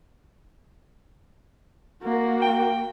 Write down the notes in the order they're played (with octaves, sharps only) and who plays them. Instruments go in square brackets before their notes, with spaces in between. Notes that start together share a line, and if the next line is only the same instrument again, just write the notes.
[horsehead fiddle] A#3 F#4
[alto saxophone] G5